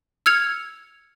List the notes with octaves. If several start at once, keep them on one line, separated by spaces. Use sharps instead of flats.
E6 F6 G#6 C#7 F7